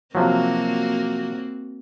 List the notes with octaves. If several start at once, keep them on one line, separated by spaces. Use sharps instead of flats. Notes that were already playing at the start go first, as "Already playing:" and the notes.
C3 F3 F#3 A#3 C4 F#4